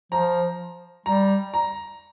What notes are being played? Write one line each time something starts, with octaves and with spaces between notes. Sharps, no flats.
F3 A#5
G3 A#5
A#5